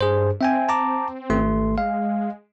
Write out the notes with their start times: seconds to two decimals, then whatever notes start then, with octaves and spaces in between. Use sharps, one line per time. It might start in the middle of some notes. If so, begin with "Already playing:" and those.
0.01 G2 G#4 C5
0.41 C4 E5 G5 G#5
0.69 A5 A#5 D6
1.30 G#1 A3 C6
1.78 G#3 F5